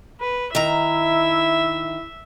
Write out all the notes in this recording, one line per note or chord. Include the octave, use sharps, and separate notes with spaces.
B4
D#3 E4 E5 A#5